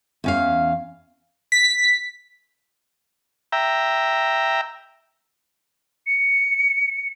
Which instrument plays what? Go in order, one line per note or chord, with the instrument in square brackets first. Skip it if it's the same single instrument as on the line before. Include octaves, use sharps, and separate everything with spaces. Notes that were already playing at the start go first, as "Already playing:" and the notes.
[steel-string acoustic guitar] E2 C#4 F5
[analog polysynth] B6
[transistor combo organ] E5 G5 A#5
[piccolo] C#7